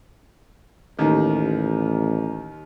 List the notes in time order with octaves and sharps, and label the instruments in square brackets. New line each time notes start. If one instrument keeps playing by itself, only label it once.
[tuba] A1 [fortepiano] D#2 D#3